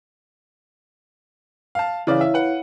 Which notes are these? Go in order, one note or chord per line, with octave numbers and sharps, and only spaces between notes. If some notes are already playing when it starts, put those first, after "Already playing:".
F5 A5
C#3 E3 E4 C#5 D5 F5
E5
B4 F#5